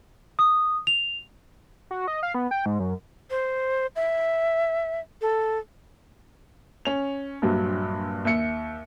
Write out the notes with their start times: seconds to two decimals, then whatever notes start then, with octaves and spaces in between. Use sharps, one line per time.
0.39 D#6
0.87 F7
1.91 F#4
2.08 D#5
2.23 F5
2.34 B3
2.51 G5
2.66 G#2
2.80 F#2
3.31 C5
3.96 E5
5.21 A4
6.85 C#4 F7
7.42 A#1 G2 F#3
8.25 D#2 E5 C#7